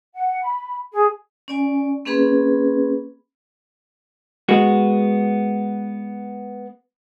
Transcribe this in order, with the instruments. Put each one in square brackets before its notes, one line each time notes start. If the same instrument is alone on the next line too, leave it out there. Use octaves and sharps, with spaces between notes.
[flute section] F#5
B5
G#4
[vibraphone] C#4 D5 G#5
A#3 C4 C#4 G#4 B4 B5
[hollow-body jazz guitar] G#3 B3 F#4